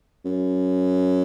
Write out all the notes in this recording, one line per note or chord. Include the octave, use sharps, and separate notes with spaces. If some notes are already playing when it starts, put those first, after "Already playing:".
F#2